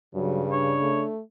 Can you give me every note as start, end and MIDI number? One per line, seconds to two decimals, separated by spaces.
0.15 0.76 43
0.15 1.03 49
0.15 0.42 54
0.52 1.12 62
0.52 1.03 73
0.81 1.20 57